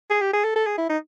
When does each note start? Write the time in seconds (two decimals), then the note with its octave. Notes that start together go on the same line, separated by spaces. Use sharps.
0.10 G#4
0.21 G4
0.33 G#4
0.44 A4
0.56 A4
0.66 G#4
0.78 E4
0.89 D#4